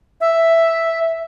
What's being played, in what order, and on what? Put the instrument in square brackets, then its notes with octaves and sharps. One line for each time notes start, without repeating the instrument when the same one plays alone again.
[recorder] E5